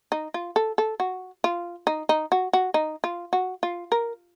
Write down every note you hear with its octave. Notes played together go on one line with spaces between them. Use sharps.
D#4
F4
A4
A4
F#4
F4
D#4
D#4
F#4
F#4
D#4
F4
F#4
F4
A#4